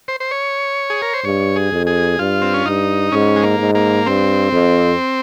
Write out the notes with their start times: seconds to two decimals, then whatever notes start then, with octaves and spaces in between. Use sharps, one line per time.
0.08 C5
0.20 C5
0.31 C#5
0.90 G#4
1.02 A#4
1.13 C5
1.24 G2 C#5
1.56 G#4
1.72 F2
1.87 G#4
2.19 G2 F4
2.42 C4
2.54 C#4
2.65 G2 D#4
3.12 G#2 C#4
3.36 G#3
3.43 A#3
3.59 G#2
3.75 A#3
4.06 G2 C4
4.52 F2